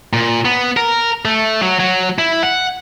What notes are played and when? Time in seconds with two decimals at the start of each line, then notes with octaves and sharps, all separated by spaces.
0.13 A#2
0.45 B3
0.77 A#4
1.25 A3
1.62 F#3
1.80 F#3
2.18 E4
2.43 F#5